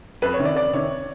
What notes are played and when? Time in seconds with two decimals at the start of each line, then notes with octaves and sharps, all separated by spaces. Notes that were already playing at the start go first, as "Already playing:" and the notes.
0.22 F2 B4
0.34 C#5
0.39 C3 D#3
0.45 D5
0.55 F2 D5
0.73 C3 D#3 C#5